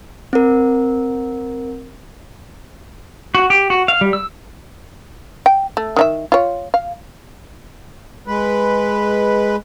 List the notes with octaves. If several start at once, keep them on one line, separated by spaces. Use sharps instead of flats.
C4 A#4
F#4
G4
F#4
F5
G3
E6
G5
A3
D#3 D#4 E5
F4 C#5
F5
G#3 B4